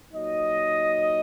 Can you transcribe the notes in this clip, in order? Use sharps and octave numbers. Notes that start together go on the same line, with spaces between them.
A#2 F#3 D#4 D#5